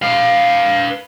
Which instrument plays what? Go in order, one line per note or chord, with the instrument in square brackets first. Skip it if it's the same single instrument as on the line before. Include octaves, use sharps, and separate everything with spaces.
[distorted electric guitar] B4 F5